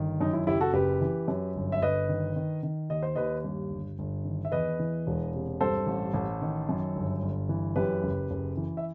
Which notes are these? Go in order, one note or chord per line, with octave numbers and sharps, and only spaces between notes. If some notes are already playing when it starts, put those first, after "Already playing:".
Already playing: G1 D#3
F#2 D#4
E4
F#1 E4 G4
F#4 A4
F#1 G4 B4
E3
F#2
G1
E5
G1 B4 D#5
D#3
D#3
D#3
D#2 D#5
C5
D#2 B4 D#5
G2
G1
G1
D#3
E5
E2 B4 D#5
E3
E1
C3
G2 A4 C5
A1
A1
D#3
F#2
G1
G1
E3
F#2 G4 B4
F#1
F#1
E3
E5